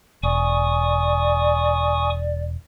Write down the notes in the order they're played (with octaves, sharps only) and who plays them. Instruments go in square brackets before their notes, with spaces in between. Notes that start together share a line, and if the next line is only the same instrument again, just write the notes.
[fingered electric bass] E1 [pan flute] D5 [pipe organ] G#5 C#6 D#6